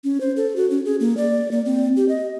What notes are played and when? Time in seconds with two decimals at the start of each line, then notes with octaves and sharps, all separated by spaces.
0.04 C#4
0.21 C5
0.37 A4
0.56 F#4
0.70 C#4
0.85 G#4
1.00 A#3
1.17 D5
1.51 A#3
1.66 C4
1.96 G4
2.09 D#5